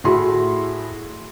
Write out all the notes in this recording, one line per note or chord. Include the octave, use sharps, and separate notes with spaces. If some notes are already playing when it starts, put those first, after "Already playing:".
A2 E4 F#4 G#4 C6